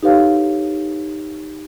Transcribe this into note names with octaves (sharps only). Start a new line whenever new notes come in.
D#4 G4 A4 B4 C#5 F5